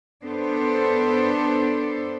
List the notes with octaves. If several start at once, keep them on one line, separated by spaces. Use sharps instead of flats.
B3 D4 A4 C5